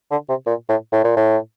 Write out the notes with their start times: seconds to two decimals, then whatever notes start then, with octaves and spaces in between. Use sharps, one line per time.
0.11 D3
0.29 C3
0.47 A#2
0.69 A2
0.92 A2
1.05 A#2
1.17 A2